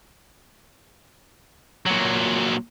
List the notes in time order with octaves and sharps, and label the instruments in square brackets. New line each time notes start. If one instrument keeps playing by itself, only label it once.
[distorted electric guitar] A#2 F#3